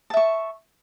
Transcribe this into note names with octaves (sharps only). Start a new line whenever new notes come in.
E5 A5 C#6